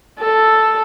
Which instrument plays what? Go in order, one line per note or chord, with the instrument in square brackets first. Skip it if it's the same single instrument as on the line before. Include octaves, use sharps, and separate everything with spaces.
[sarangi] A4